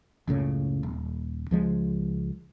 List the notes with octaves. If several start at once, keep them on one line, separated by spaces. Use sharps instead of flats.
F#1 C#2 A2 C#3
D#1
C#2 F3 G#3